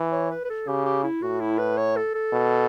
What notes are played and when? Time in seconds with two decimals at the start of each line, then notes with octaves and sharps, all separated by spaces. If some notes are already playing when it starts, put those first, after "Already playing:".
Already playing: E3
0.12 C#5
0.31 B4
0.45 B4
0.50 A4
0.67 C#3 G4
0.85 G4
1.04 E4
1.22 A2 F#4
1.40 E4
1.59 B4
1.78 C#5
1.96 A4
2.15 A4
2.32 B2